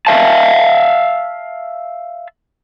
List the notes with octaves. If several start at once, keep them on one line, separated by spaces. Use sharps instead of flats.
E5 F5 A5